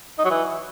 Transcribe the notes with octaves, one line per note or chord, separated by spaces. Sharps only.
D#4
F#3
E3